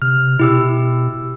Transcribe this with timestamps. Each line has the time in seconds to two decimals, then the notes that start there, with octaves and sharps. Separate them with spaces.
0.02 C3 F6
0.39 B2 E4 G4 E6